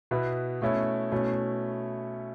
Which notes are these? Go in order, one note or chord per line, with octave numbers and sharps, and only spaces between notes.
B2 B3 E4
B2 A3 C#4 E4
B2 A3 C#4 E4